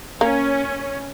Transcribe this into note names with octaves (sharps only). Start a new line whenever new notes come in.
A#3 C#4